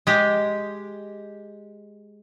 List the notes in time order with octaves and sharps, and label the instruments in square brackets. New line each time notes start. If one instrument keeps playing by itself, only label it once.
[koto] G#3 G4